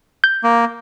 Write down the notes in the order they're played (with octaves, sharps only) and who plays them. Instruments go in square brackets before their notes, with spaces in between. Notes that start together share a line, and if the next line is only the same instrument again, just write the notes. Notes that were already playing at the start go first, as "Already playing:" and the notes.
[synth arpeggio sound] G6
[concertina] A#3